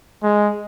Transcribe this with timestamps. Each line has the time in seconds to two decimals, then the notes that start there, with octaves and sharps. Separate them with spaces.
0.23 G#3